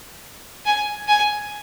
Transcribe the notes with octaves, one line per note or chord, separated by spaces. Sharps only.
G#5
G#5